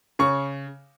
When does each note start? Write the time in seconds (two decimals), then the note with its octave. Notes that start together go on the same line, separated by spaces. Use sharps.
0.19 C#3 C#6